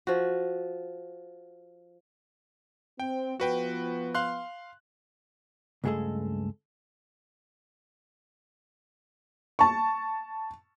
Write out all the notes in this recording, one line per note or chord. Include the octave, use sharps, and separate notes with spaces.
F3 F#4
C4 G5
F3 B3 F#4 B4 G5
F5 C6 F#6
C#2 G2 G#3 A3 G#4 A4
A5 C#6